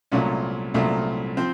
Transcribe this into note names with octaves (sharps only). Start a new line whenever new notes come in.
C2 A#2 F#3 A3 C#4
C2 A#2 F#3 A3
F3 C4